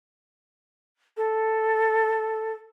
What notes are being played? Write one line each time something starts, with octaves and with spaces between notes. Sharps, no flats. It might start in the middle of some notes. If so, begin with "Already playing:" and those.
A4